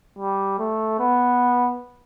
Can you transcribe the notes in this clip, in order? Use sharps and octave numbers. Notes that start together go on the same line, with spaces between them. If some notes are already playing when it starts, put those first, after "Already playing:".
G3
A3
B3